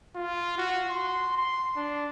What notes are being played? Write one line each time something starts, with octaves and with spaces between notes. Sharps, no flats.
F4
F#4
C6
C6
D4